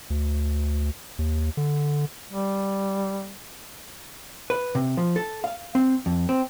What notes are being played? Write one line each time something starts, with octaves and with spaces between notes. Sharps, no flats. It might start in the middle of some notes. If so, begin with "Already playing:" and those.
D2
D#2
D3
G3
B4
C3
F3
A4
F5
C4
F2
C4